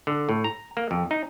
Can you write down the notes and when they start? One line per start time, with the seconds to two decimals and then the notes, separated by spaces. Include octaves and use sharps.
0.07 D3
0.29 A2
0.44 A#5
0.77 A#3
0.91 F2
1.11 D#4